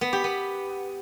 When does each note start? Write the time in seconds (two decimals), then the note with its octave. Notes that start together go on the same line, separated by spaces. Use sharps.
0.01 B3
0.13 G4
0.24 B3